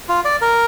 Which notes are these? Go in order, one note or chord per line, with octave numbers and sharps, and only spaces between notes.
F4
D5
A#4